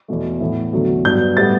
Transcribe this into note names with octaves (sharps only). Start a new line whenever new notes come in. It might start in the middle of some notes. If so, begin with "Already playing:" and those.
E2 B2 A3
A2 E3 B3
E2 D3 F#3 A3
G2 F#3 B3 G6
A2 G3 B3 A6